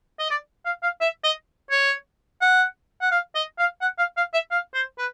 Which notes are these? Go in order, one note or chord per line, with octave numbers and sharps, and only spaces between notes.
D#5
D5
F5
F5
E5
D#5
C#5
F#5
F#5
F5
D#5
F5
F#5
F5
F5
E5
F5
C5
B4